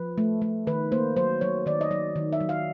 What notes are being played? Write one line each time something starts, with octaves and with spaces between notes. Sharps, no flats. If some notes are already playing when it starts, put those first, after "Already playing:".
Already playing: F3 B4
A3
A3
D#3 B4
A#3 C5
F#3 C5
F#3 C#5
D#3 D5
D#5
F#3 D5
D#3
E5
F#3
F5